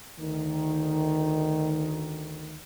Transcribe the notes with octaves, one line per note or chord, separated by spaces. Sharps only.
D2 D#3